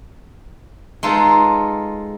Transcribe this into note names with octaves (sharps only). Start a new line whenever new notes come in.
G#3 D#4 F4 A4 B4